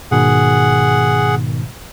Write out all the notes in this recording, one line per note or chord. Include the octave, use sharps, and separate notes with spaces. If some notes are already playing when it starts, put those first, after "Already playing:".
G#2 B2 D#3 G#4 F#5